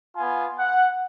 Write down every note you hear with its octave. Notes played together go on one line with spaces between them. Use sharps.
B3 F4 G#5
F#5